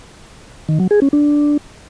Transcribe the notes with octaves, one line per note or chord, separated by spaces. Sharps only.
D#3
F#3
G#4
C#4
D4